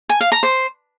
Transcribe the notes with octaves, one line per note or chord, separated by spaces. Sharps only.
G#5
F5
A#5
C5